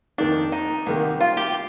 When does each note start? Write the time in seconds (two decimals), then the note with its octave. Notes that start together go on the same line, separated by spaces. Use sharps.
0.18 F2 D#3 A#3 D4 D#4
0.52 D#4
0.86 C2 C3 D#3 A#3
1.21 F4
1.37 G4